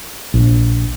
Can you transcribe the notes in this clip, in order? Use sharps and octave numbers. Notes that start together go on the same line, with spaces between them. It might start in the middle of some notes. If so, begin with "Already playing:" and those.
A#1